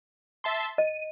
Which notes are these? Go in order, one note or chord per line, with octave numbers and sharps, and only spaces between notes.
E5 A5 C6
D#5 D#7